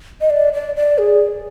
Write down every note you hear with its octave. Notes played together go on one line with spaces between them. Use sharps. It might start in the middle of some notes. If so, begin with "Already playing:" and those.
D#5
D5
D5
D5
G#4